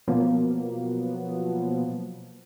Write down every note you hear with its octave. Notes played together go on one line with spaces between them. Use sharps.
B2 F3 F#3 A#3 B3